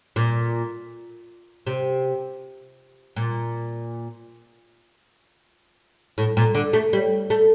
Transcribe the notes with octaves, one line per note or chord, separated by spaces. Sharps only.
A#2
C3
A#2
A2
A#2
D3
A3
G3
A3